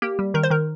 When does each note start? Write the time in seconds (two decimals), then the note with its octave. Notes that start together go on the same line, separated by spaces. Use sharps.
0.02 A#3 G4
0.19 G3
0.34 D#3 A#4
0.43 C5
0.50 D#3 A#4